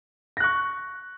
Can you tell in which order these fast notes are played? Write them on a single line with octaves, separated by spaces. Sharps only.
A#6 F#6 C#6